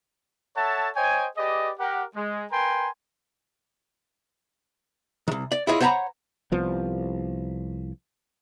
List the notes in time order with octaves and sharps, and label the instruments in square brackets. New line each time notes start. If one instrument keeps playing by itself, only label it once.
[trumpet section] A4 C#5 E5 F#5 A5
C5 C#5 D#5 G5 G#5
G4 G#4 B4 D5 D#5
G4 A#4 F#5
G#3
A#4 B4 G5 G#5 A#5 C6
[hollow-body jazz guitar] C2 D#3
D5
E4 F4 G#4 C#5 D#5
C5 C#5 F#5 G#5 A#5 B5
[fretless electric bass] C2 F3 B3